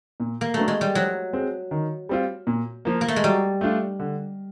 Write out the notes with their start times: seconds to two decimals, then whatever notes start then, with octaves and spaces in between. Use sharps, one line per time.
0.20 A#2
0.41 A#3
0.54 F#3 A3 B3 D4
0.68 G#3
0.81 G3
0.95 F3 F#3
1.33 G#3 C4
1.71 D#3
2.09 G3 C4 F4
2.47 A#2
2.85 F3 A#3
3.01 A#3
3.08 A3
3.16 G#3
3.24 F#3 G3
3.61 A3 D4 F4
3.99 D3